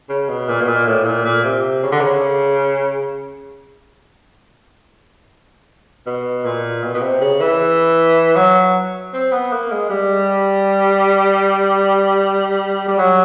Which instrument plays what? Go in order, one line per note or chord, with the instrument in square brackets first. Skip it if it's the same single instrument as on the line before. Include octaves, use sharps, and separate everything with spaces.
[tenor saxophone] C#3
B2
A#2
B2
A#2
A2
A#2
A#2
C3
C#3
D3
C#3
B2
A#2
B2
B2
C3
C#3
E3
F#3
C4
B3
A#3
G#3
G3
G3
F#3